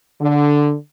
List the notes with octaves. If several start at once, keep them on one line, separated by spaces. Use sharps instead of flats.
D3